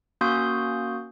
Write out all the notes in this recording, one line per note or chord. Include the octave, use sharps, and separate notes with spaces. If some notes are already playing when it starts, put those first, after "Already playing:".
A#3 C#4 F#4 C6 D#6 G6